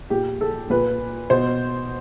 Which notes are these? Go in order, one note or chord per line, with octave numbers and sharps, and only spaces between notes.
A#2 G4
A4
A#2 B4
B2 C5